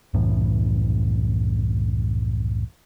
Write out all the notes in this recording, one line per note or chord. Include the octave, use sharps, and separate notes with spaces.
C2 F#2 A2 E3